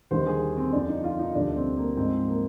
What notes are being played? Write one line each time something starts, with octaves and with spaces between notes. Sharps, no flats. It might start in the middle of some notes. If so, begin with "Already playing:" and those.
D#2 D3 G3 C5
G#4
C4
F2 D3 F3 D4
D#4
F4
D#4
D2 D3 G3 D4
C4
A#3
G#2 F3 C4
A#3